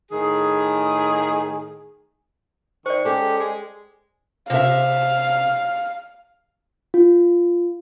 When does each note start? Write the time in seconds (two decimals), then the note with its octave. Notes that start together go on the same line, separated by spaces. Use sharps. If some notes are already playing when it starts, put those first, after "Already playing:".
0.11 A2 D#3 G#4
2.86 D#3 C5 D5 C#6
3.05 G#3 C#4 G4 A4
3.40 G#3
4.50 C3 E5 F5
6.94 F4